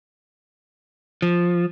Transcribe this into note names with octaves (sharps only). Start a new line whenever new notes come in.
F3